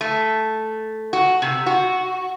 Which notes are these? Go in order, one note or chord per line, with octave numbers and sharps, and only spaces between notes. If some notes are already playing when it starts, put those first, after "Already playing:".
A3
F#4
C3
F#4